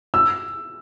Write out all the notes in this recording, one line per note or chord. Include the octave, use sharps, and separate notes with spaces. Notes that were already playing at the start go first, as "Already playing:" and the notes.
E6